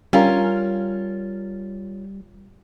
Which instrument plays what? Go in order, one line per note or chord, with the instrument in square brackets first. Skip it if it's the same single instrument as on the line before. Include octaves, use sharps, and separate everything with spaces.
[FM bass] G3 [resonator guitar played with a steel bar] C#4 F4 A#4